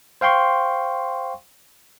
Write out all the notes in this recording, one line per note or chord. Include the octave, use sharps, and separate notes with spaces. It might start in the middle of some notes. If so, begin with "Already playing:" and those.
C5 F5 G5 C6 C#6